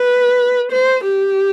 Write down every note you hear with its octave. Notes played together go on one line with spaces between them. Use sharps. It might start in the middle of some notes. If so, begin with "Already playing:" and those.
Already playing: B4
C5
G4